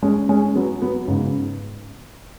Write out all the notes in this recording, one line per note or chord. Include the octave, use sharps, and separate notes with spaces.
G#3 C#4
G#3 C#4
F#3 B3
F#3 B3
G#2 C#3